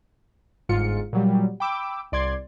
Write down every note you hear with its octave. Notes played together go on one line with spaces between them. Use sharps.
G1 G#2 F4 C#7
A#2 F#3 G3
G5 B5 D6 E6
C2 D5 C6 G#6